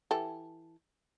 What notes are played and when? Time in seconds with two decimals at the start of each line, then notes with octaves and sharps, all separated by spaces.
0.11 E3 G4 A4